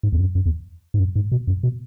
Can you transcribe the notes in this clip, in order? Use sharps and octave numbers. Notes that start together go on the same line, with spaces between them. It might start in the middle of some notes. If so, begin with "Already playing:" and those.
G#2
E2
F#2
F#2
E2
G#2
F#2
G#2
B2
F#2
B2